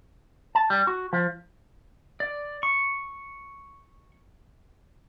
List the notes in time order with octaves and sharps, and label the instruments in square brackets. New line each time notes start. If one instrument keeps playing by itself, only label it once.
[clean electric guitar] A5
G3
F#4
F3
[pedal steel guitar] D5
C#6